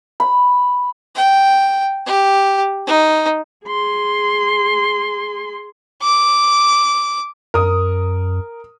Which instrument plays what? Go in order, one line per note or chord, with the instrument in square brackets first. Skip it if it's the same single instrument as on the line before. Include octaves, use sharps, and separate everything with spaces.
[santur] B5
[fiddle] G5
G4
D#4
[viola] G#4 C6
[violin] D6
[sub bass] F#2 [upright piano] A#4 D#6